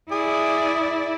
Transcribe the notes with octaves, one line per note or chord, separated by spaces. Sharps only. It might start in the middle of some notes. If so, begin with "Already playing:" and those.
E4 G#4 D5